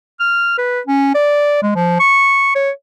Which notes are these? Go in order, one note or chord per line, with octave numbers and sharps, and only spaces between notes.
F6
B4
C#4
D5
G#3
F3
C#6
C#5